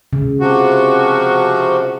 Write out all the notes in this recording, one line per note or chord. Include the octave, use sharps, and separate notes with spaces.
C#3
C3 F3 F#4